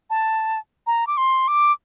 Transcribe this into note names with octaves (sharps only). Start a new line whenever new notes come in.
A5
A#5
D6
C6
D6